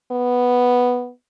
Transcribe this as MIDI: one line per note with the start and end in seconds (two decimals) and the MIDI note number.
0.12 1.10 59